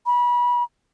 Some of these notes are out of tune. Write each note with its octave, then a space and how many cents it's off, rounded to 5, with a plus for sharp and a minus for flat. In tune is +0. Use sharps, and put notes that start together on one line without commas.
B5 -30